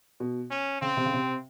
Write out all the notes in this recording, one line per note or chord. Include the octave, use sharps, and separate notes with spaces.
B2
C#4
C#3 C4
C3
C#3
C3